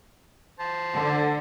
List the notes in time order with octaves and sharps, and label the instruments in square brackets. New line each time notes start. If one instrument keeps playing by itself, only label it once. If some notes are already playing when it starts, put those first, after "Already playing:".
[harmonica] C5 A5
[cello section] D3